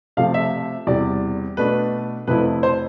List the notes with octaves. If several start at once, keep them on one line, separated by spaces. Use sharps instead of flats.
C3 F3 A3 F5
E5
E2 C3 G3 D5
B2 A3 D4 B4
F2 C3 F3 A3 E4 B4
C5